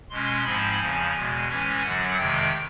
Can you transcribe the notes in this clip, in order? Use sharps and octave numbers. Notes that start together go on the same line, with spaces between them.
B2 G#3 C#4 C6
G#2 F3 G#3 C4 B5
E2 C#3 F3 G#5
E2 B2 G#3 G#5
A2 E3 G#3 C#4
F#2 D3 F#3 F#5
F2 C3 D#3 G#3 G5